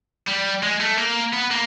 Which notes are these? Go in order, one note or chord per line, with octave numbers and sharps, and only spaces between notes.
G3
G#3
A3
A#3
B3
A#3